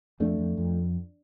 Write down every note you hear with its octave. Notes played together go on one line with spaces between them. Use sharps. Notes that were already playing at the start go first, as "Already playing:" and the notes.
F2 A3 D4
F2
F2